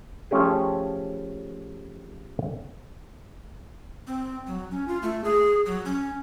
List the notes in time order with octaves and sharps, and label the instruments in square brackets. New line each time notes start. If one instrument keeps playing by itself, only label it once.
[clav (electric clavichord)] F3 A3 C#4 G4 G#4
[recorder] C4
F#3
C#4
F4
A3
G#4
F#3
C#4